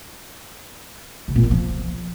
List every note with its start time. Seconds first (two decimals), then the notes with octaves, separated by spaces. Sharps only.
1.28 C#3
1.36 A#2
1.43 A#3
1.51 F3